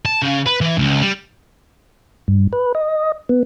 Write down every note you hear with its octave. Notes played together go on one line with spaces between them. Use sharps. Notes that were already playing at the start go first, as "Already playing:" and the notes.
A5
C#3
B4
E3
C#2
G3
G2
B4
D#5
B3